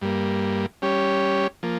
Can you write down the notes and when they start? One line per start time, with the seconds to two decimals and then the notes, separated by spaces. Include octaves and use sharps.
0.02 G2 G3 A#3
0.82 G3 C#4 G4 C#5
1.63 F3 A#3